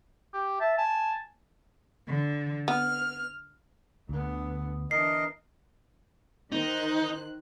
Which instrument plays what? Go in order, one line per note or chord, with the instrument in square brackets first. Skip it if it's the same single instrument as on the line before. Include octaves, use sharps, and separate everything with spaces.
[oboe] G4
[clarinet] E5 [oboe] A5
[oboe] G#5 [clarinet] A5
[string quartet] D3
[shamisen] B3 [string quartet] F6
[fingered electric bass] D2 [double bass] D3 B3
[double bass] E3 D4 [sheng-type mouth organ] A#4 D#5 [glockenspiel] C7
[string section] D#3 C5 F#6 [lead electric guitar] D#4